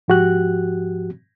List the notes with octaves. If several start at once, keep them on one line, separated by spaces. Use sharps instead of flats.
G#2 F3 F#4 G4 F#6